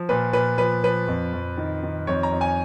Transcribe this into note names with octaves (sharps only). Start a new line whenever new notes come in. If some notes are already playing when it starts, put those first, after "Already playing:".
Already playing: F3
A#2 B4
A#2 B4
F3 B4
F3 B4
F2
F2
D#3
D#3
F2 C#5
A#5
F2
G#5